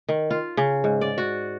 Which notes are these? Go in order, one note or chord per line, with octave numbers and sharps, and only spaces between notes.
D#3
F4
C#3
G#2
D5
F#4